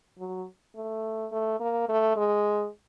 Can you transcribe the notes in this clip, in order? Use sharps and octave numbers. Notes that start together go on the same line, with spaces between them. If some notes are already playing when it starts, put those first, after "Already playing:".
F#3
A3
A3
A#3
A3
G#3